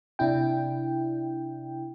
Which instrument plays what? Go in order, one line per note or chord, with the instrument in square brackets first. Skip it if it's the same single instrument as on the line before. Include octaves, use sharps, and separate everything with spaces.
[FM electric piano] C3 D4 E4 G5